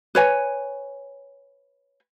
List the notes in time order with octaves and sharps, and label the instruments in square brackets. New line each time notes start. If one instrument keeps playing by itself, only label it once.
[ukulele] B4 C#5 G#5